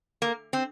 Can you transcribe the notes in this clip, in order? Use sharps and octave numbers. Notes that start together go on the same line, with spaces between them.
A#3
C4